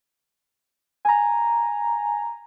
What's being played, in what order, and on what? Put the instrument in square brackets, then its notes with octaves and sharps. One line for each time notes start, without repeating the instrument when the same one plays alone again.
[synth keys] G#5 A#5